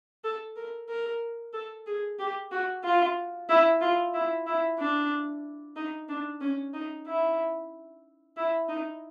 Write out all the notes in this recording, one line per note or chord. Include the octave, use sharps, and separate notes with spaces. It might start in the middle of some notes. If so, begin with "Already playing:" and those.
A4
A#4
A#4
A4
G#4
G4
F#4
F4
E4
F4
E4
E4
D4
D#4
D4
C#4
D#4
E4
E4
D#4